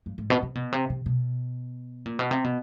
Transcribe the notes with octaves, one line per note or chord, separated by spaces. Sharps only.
G2
G#2
B2
C3
B2
C3
C3
B2
A#2
B2
C3
B2